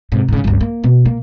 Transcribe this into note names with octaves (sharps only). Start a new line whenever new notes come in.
G#2 C3
G#2 C#3
G1 C#2
A#3
B2
A#3